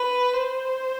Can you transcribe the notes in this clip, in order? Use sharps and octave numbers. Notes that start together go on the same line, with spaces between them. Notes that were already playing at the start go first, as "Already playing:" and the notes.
Already playing: B4
C5